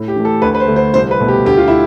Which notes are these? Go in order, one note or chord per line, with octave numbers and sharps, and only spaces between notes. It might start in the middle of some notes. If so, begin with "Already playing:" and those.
Already playing: A2
G4
E3 A3
A4
D2 B4
B4
C5
D3 A3
C5
C2 C5
B4
B2 A3
G4
D2 G4
F4
E4